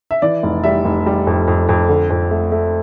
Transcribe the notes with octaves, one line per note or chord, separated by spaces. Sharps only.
E5
E3 D5
F1
G3 E5
F1
G3
F2
F2
F2
D3
F2
A3
A3